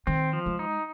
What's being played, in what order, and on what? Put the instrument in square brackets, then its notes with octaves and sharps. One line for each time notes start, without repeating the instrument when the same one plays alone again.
[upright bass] D#3 [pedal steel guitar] C4
[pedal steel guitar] F3
[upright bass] G#3
[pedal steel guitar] D#4